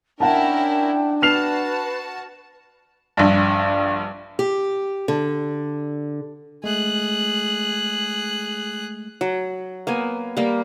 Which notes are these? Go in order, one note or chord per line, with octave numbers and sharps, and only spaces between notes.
C#4 D4 E4 A#4 F#5 G5 A5
F#4 B4 A5 F6 C7 F7
A#1 G2
G4
D3
G#3 A3 G#4 F#6
F#3
A#3 B3 G#5
G3 A#3